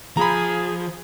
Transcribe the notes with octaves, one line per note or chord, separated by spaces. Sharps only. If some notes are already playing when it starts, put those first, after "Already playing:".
F3 G#4 A#5 B5